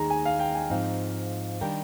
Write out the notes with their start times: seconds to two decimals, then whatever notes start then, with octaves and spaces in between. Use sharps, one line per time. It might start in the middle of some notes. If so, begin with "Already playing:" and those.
Already playing: D#2 D#3 G#3 D#4 G#4 A#5
0.10 G#5
0.25 F5
0.39 G5
0.55 G#5
0.70 G#2 F3 C4 D#4 F5
1.61 D#3 G3 D4 G4 A#4 G5